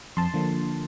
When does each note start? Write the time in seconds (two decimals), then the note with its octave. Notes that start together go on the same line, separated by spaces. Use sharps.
0.17 F2 A5 C6
0.34 D3 F3 A#3